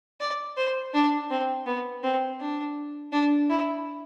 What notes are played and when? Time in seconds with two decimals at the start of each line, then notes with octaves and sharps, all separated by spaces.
0.20 D5
0.57 C5
0.94 D4
1.30 C4
1.66 B3
2.04 C4
2.40 D4
3.12 D4
3.49 E4